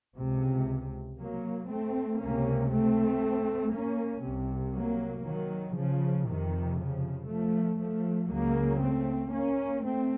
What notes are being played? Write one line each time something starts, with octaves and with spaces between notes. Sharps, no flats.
C#2 C3
F#3 A#3
A3 C4
C#2 C3 A#3 C#4
A3 C4
A#3 C#4
C2 C3
F#3 A#3
D#3 F#3
C#3 F3
F2 C3 D#3
C#3 F3
F3 A3
F3 A3
C#2 C#3 F#3 A#3
A3 C4
A#3 C#4
A3 C4